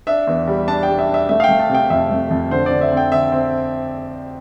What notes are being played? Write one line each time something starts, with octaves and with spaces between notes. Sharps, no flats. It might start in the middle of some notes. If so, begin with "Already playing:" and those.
D4 E5
E2
G3
D4 A5
G5
G3
E5
D4
E5
A3 E5
F5
A3 G5
A5
C3
G5
F2 E5
A3
F2
D3 C5
D3 D5
E5
C4
G5
D3 E5
C4